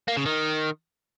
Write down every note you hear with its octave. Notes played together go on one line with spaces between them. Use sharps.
A#3
C#3
D#3